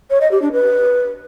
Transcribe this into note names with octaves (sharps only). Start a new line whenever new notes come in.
C#5
D#5
G4
D4
B4